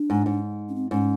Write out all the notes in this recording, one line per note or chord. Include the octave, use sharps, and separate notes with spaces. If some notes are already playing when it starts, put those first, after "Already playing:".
Already playing: D4
G#2
G#2
C#4
C4
G#2 C#4